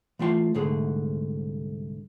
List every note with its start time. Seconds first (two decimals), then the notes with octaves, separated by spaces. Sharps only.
0.19 E3 A3 F4 F#5 C6
0.54 C2 G#2 D3 A3 G#4